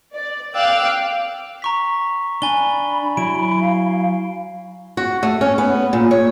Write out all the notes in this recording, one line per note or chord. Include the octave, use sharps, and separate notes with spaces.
D5
F5 G5 D6 E6 F#6
A#5 C#6 B6
D4 G#5 B5 G7
F#3 E4 D7
F5
F#4
A3
C#4
B3
A#2
C#5